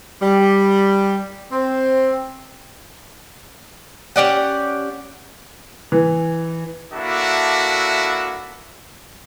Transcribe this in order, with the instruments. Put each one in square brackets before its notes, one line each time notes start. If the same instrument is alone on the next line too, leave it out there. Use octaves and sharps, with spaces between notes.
[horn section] G3
C4
[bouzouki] C#4 G4 D5 F#5
[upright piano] E3
[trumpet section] A#3 D4 E4 F#4 A4 E5